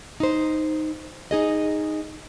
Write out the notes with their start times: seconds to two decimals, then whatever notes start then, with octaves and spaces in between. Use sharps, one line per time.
0.20 D#4 C5
1.31 D#4 G#4 D#5